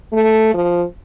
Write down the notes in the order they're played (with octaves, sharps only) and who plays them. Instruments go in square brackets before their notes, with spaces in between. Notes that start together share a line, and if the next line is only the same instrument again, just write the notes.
[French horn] A3
F3